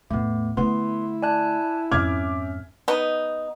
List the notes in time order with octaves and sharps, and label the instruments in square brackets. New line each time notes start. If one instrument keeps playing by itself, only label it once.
[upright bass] E2 A2 [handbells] A3 B3
[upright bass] D3 A3 [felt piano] B3 [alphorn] E4 [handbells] C6
[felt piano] D5 [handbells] G#5 A5 F#6
[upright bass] F2 G#2 [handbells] C#4 E5 [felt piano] D6 F6 G#6
[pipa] B3 D#4